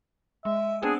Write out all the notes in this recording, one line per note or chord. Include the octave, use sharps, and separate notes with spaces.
G#3 E5
B3 C4 D4 G#4